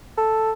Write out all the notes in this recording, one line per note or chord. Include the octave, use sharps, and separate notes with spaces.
A4